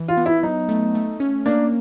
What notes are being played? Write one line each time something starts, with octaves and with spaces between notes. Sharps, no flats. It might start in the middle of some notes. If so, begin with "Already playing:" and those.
Already playing: E3
F4
B3
E4
F#3 D#4
A3
A3
C#4
A#3 D4